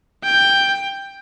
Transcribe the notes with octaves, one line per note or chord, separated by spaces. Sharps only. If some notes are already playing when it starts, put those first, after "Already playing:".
G5